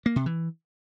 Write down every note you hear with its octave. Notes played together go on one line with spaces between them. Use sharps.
A#3
C3
E3